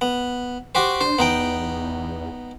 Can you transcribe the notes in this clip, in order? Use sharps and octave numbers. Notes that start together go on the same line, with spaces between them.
B3
F#4 G4 C5
D4 C5
E2 B3 D#4 G5